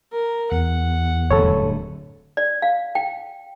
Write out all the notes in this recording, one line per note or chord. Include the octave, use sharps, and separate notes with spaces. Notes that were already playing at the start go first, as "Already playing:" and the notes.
A#4
E2 F#5
D1 G2 A4 C#5
D5
F5
G5